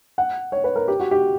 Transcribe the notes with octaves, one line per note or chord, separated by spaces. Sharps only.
F#5
C#5
B4
A#4
G4
F#4
G4